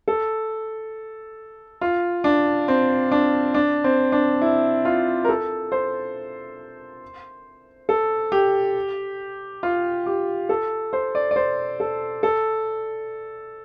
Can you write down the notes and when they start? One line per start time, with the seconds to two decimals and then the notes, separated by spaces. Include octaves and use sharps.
0.08 A4
1.81 F4
2.24 D4
2.68 C4
3.12 D4
3.54 D4
3.84 C4
4.12 D4
4.42 E4
4.85 F4
5.25 A#4
5.29 A4
5.72 C5
7.89 A4
8.32 G4
9.63 F4
10.06 G4
10.49 A4
10.93 C5
11.15 D5
11.31 D5
11.36 C5
11.80 A4
12.23 A4